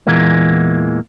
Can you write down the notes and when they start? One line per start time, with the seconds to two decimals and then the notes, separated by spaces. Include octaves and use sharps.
0.07 E2 A#2 E3 G#3 A#3